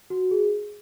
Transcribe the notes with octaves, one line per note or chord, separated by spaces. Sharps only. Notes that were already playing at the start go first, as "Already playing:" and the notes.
F#4
G#4